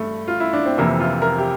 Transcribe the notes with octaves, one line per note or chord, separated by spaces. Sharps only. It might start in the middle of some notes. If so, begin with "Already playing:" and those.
Already playing: G2 A3
F4
E4
D4
C4
F2 C3 E3 A#3
F4
A#4
G4